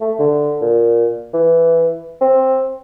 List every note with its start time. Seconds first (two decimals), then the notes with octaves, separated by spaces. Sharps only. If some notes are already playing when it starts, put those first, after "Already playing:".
0.01 A3
0.19 D3
0.62 A#2
1.34 E3
2.21 C4